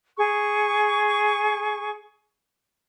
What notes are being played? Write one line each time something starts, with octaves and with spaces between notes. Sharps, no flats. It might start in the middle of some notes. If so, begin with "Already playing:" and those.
G#4 C#6